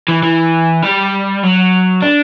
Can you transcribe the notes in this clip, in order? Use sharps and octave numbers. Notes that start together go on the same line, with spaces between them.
E3
E3
G3
F#3
D4